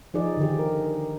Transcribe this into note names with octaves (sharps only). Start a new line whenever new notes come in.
F3 D#4 G#4 D5
D3 D#3 G4
A#4